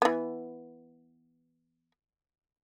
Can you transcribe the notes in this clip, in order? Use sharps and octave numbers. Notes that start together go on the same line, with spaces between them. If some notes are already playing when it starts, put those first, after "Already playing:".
E3 B3